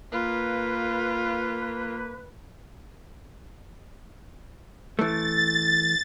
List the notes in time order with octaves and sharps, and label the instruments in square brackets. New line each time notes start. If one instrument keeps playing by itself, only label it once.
[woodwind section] A#3 B4 [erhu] F4
[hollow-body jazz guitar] E3 A3 [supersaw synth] A6